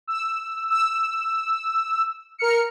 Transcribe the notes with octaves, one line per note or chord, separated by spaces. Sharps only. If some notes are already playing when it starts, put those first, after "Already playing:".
E6
E6
A#4 F6 C#7